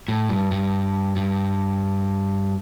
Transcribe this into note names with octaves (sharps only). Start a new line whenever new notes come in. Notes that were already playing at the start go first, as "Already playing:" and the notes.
A2
G2
G2
G2